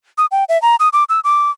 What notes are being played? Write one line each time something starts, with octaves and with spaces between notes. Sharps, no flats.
D#6
G5
E5
A#5
D#6
D6
E6
D6